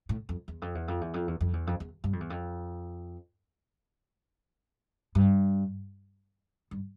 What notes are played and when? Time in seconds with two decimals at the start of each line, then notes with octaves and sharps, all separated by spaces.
0.09 A2
0.29 F2
0.48 E2
0.62 F2
0.75 E2
0.88 F2
1.01 E2
1.14 F2
1.28 E2
1.41 F2
1.53 E2
1.67 F2
1.80 E2
2.04 G2
2.13 F2
2.20 E2
2.30 F2
5.15 G2
6.71 G2